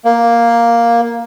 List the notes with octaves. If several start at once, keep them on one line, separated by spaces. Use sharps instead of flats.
A#3